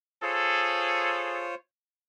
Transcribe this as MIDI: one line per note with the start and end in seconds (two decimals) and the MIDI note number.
0.23 1.55 65
0.23 1.48 68
0.23 1.48 69
0.23 1.55 72
0.23 1.55 73